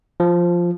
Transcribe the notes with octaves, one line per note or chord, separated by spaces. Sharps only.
F3